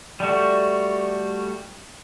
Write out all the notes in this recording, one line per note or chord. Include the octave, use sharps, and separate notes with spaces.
G3 A3 F#4